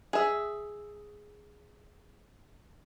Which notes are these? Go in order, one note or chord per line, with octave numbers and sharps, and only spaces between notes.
G#4 E5